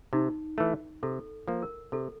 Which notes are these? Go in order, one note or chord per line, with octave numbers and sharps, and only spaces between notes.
C3 D#4
E3 A3
C3 A4
F3 A#3
A#4
C3 A4